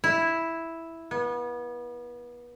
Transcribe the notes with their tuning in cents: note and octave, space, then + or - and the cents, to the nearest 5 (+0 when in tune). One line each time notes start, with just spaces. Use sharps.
E4 +0
B3 -30